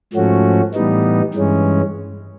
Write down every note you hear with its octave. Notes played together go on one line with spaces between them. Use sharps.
G#2 F3 A3 C#4 F#4
A2 E3 G3 B3 D#4
G2 E3 G#3 C#4